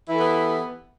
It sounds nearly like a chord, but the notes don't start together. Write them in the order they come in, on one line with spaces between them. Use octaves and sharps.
E4 E3 A4 G4 B3